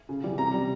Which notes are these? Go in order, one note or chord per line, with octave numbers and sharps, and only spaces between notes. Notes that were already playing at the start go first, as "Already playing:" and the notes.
C#3
E3 G3
C3 A#5
G3